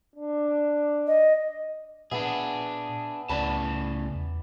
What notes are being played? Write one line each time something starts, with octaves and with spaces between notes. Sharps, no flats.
D4
D#5
A#2 B3 D4 G#4 E5
C#2 A2 C#3 D5 A5 B5
E2